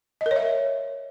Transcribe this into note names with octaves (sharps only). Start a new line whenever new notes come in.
D#5
A#4
C#5
E5